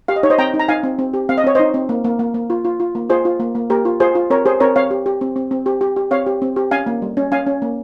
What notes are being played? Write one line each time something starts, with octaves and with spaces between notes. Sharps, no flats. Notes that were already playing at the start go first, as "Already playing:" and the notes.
G4 F5
D#5
D#4 C#5
C5 D#5
C4 G5 A#5
D#4
A#5
D#4 F5 G#5
C4
C4
G4
C4 F5
D#5
C4 C#5
D#4 C5 D#5
C4
A#3
A#3
A#3
A#3
F4
F4
F4
A#3
F4 G#4 C5
F4
A#3
A#3
A#3 G4 A#4
F4
F4 G#4 C5
F4
C4 A#4 C#5
G4 G#4 C5
C4 A#4 C#5
C4 C#5 F5
G4
G4
C4
C4
C4
G4
G4
G4
C4 C#5 F5
G4
C4
G4
C#4 F5 G#5
A#3
G3
C#4
C#4 F5 G#5
C#4
A#3